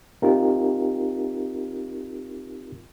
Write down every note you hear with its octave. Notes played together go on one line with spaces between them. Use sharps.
C4 D#4 F4 G4 A#4